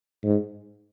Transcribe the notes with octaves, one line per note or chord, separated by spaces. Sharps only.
G#2